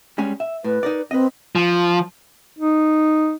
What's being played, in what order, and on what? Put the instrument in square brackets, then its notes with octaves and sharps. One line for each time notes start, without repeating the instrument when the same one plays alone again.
[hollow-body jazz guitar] G3 G#3 C#4
E5
[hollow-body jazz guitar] A2 [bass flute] B4
[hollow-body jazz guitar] D#4 A#4 D5
[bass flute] C4 [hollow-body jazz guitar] B4 D#5
[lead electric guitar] F3
[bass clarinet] D#4